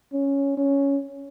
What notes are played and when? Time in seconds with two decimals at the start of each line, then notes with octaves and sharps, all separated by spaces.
0.13 C#4
0.57 C#4